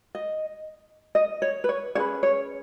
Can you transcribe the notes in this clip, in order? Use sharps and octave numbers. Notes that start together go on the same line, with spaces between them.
D#5
D#5
C#5
B4
C#5
C#4 G#4 B4 C#5
C#5